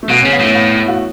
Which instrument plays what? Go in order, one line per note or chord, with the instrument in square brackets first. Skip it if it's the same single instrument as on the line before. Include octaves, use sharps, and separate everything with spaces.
[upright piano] A3
[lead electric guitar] B2 [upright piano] B3
[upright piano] C#4
[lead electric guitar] C#3
[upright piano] B3
[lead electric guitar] A2 [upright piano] A3
[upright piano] B3
E4
E4
F#4